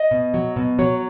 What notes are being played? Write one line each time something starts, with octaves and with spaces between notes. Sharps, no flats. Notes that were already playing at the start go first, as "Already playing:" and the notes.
Already playing: D#5
B2
F#3
B2
F#3 C#5